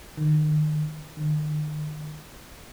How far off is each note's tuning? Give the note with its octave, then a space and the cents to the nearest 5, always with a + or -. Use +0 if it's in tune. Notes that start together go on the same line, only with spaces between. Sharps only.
D#3 -35
D#3 -45